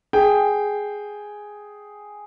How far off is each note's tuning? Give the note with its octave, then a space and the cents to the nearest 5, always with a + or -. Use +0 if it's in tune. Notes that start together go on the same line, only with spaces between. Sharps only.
G#4 +0 G5 +0